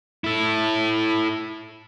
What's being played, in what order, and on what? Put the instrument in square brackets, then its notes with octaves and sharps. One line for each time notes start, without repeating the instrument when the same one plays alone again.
[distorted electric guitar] E4 A4